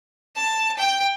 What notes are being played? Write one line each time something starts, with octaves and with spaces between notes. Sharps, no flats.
A5
G5